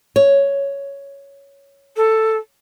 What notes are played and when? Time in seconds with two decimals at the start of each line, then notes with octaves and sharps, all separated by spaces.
0.16 C#5
1.96 A4